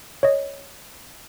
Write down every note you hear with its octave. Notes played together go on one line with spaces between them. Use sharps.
C#5 D#5